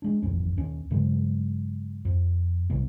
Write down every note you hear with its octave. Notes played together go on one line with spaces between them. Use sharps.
G#3 D4
D#1 A1 F2 C#4
D#2 C#4
G2 C#3 F#3 G#3
F2
B1 C3 G3 B3